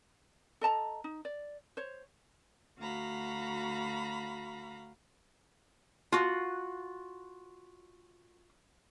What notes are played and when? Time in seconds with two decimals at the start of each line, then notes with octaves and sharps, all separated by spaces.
0.61 A4 D#5 A5 A#5
1.04 D#4
1.25 D5
1.77 C5 C#5
2.78 D2 F#4 F5 A#5 B5
6.12 F4 F#4